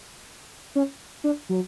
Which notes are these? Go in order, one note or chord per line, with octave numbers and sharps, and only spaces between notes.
C#4
D4
F#3